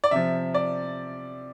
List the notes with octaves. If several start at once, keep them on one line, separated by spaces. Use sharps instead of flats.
D5
C3 F3 E5
D5